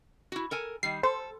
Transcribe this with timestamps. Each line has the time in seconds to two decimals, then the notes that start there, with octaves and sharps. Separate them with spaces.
0.32 E4 F#4
0.51 A4 A#4 G#5
0.83 D#3 G3 C7
1.03 A4 C5